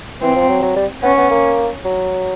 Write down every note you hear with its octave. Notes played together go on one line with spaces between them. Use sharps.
E3 C4
F3
F#3
F#3
G3
B3 C#4
B3
A#3
F#3